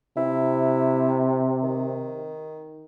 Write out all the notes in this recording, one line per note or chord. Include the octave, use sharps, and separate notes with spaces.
C3 E4
D#3